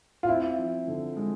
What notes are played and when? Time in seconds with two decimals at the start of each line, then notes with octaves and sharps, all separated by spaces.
0.23 F4
0.29 C4 E4
0.58 F3
0.87 D3
1.17 G#3